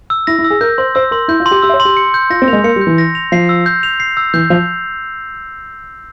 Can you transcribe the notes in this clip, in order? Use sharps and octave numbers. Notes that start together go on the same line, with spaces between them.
E6
E4 A#6
E4
E6
G#4
A#4 G6
C5 C6
C5 E6
A#4 C6
E4 G6
F4
C6
G4
G4 E6
E5
C#5
C6
G4
C#7
G6
F4 A#6
C4
A#3 F7
G#3
A#3 C#7
G3
G6
E3
A#6
F7
F3 C7
E6
G6
F7
C7
E6
E3 G6
F3 F7